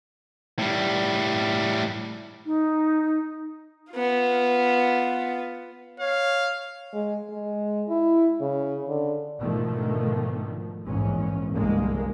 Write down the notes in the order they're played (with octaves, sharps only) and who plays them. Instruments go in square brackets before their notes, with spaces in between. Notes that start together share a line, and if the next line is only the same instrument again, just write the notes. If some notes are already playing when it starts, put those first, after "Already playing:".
[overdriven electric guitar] A2 G3
[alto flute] D#4
[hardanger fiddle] B3 F4
[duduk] C#5 [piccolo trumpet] F5
[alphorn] G#3
G#3
E4
C#3
D3
[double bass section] G#2 B2 D3 D#3 F3 A3
A#1 E2 G#2 C#4
G1 C2 G#3 A#3